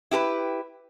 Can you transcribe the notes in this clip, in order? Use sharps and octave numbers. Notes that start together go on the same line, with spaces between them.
E4 G4 A#4 B4